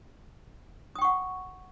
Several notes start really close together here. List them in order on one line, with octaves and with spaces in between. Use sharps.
D#6 G5 C#6 F#5